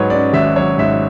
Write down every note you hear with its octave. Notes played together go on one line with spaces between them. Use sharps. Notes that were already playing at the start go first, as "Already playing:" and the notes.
Already playing: G#2 F#3 B4 C#5 F#5
C#4 D5
G#1 E5
F#3 C#5
G#2 E5